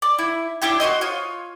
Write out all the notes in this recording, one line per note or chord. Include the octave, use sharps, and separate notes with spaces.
D5
E4
D4 E4 G4 G5
F#4 G4 C5 D#5
F4 C#5